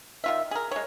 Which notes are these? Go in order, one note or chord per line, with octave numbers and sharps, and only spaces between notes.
D#3 F4 E5
G#4 A#4
G#3 C#5